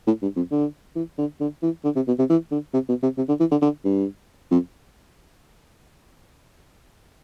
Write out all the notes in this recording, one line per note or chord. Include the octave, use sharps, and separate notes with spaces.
A2
G2
F2
D3
E3
D3
D3
E3
D3
C3
B2
C3
E3
D3
C3
B2
C3
C3
D3
E3
D3
D3
G2
F2